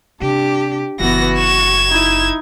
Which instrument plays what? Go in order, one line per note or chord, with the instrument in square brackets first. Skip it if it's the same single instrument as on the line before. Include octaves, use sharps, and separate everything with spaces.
[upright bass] C3 [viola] D4 [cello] G4
[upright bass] F#1 [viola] E3 B3 [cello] F#4 [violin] A#6
[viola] C#6 [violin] G#6 E7
[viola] D#4 E4